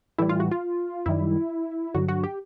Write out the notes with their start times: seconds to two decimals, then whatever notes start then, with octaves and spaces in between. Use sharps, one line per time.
0.18 A2 E3 G3 E4
0.29 F4
0.40 F#4
0.51 F4
1.06 F#2 D#3 G3 E4
1.95 G2 D3 F#3 F#4
2.09 F#4
2.24 G4